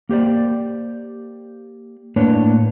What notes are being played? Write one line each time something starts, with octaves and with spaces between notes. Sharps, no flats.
A#3 G4 C5 D5
A2 A#3 D4 B4 C#5